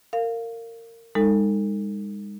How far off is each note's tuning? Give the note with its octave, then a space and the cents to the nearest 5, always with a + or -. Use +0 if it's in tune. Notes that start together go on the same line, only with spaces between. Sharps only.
A#4 -25 F5 +0
G#3 -35 D#4 -5 A4 +35